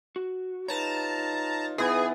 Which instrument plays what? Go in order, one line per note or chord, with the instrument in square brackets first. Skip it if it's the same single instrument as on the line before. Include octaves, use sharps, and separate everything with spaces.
[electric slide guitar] F#4
[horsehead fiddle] D#4 F4 [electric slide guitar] G4 B4 C#5 [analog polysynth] A5 A#5
[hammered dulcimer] E3 B3 [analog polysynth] G#4